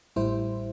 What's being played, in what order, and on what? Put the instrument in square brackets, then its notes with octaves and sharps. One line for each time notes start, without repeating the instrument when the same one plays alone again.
[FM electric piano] A1 A2 G3 E4 C5